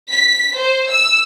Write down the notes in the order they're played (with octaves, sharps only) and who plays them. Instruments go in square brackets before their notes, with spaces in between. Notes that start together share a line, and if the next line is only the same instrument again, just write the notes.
[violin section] B6
C5
E6